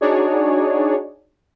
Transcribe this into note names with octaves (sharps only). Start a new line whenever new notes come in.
D4 D#4 F#4 G#4 C#5 D5